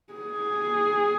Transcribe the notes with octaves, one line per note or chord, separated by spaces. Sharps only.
G#4